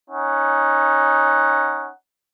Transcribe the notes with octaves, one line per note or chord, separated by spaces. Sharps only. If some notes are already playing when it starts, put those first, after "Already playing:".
C#4 D#4 F#5